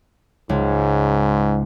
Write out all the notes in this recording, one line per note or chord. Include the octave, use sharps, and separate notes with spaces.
C#2 G#2